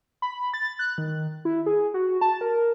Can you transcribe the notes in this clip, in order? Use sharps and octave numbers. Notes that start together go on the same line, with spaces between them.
B5
A6
F#6
D#3
E4
G#4
F#4
A5
A#4